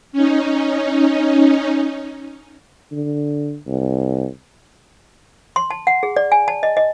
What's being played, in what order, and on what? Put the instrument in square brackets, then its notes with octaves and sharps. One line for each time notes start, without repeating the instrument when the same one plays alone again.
[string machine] C#4 D#4
[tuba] D3
C2
[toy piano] C6
A5
F#5
G#4
D5
G#5
A5
D#5
D#5